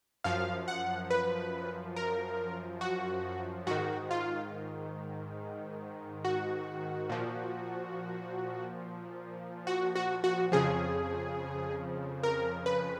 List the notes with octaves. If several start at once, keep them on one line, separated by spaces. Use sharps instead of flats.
F#2 F3 F5
F#5
B4
A#4
F#4
G#2 D#3 F#4
F4
F#4
A#2 F3
F#4
F#4
F#4
F2 C#3 F3 G#4
A#4
B4